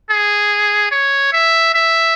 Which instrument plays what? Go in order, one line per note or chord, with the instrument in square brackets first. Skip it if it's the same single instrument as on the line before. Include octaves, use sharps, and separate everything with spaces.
[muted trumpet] G#4
C#5
E5
E5